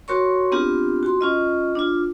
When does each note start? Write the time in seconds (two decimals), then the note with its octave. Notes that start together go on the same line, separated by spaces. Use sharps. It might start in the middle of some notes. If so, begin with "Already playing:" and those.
0.08 F#4 A#4 C#5 C6 C#6
0.52 B3 C4 D4 F4 G4
1.03 F#4 C6
1.21 C#4 F4 D#5
1.75 D4 F4